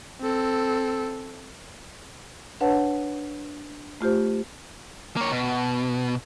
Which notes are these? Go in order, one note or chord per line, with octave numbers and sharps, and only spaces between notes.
C4 A4
D4 B4 C#5 F#5 A5
A3 F4 G4 C5
A#3 C#5
B2